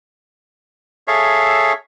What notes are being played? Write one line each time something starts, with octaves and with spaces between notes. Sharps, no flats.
G#4 A4 C#5 E5 F5